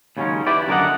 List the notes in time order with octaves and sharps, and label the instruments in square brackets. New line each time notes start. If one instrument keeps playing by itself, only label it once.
[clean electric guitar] D#2 C#3 F#3 G#3 C#4
E4 G4 B4 D5
F#2 D3 A#4 D5 D#5 F#5